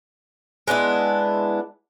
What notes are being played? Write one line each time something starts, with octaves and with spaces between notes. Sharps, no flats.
G#3 B3 D4 E4